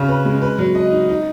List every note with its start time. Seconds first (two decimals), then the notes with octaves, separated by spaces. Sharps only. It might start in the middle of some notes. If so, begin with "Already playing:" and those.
Already playing: C#3 C#4
0.08 B4
0.25 G#3
0.42 B4
0.58 F#3
0.75 D#5
0.92 D#4
1.09 D#4